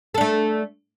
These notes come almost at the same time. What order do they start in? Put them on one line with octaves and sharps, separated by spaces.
A4 D4 A3